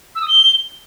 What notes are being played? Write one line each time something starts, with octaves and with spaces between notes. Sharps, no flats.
E6
D#6
G7